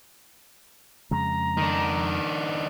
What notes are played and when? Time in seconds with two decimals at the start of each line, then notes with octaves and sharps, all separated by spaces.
1.11 F2 C#3 G#3 A#5
1.58 D#3 D4